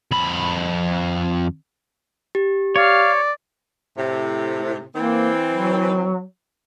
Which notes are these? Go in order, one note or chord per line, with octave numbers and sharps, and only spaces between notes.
F2 B5
G4
C#5 D5 F5
A2 C3
E3 A#3 C4
F#3